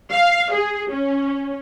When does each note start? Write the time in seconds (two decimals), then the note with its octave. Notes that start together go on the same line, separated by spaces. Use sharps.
0.11 F5
0.52 G#4
0.90 C#4